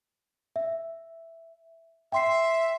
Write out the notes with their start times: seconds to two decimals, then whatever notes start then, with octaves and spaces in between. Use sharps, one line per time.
0.56 E5
2.12 E5 G5 C6 C7